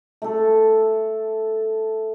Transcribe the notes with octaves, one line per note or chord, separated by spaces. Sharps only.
A3 A4